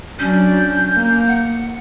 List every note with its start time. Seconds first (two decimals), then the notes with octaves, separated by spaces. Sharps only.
0.19 F#3 C#4 D4 G6
0.93 A#3
1.28 F#5